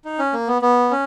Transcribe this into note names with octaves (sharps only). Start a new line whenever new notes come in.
D#4
C#4
A#3
B3
B3
C#4